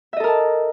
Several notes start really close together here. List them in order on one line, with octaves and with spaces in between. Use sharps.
E5 D#5 A4 A#4 A5